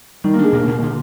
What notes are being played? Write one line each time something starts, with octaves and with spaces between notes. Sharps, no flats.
D#3 G3
A#3
D4
G#3
A#2 A#3
A#2 A#3
D3